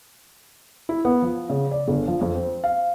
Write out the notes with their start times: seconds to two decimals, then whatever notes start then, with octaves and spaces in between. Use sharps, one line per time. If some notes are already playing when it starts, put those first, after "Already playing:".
0.89 E4
1.05 B3
1.22 F3
1.50 C#3
1.71 D5
1.88 G1
2.07 F3
2.21 F2
2.35 C4
2.64 F5